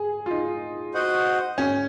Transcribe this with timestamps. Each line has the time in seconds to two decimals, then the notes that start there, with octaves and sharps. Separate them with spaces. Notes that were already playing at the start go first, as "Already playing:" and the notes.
Already playing: G#4
0.26 F4
0.31 D#4
0.94 F#4 C5 D#5 F#5
1.58 C#4